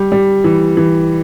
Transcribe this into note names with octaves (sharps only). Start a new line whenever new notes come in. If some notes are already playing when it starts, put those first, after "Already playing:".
Already playing: G3
G3
E3
E3